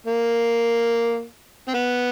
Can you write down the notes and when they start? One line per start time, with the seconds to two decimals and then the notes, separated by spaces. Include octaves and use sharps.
0.07 A#3
1.68 C4
1.74 B3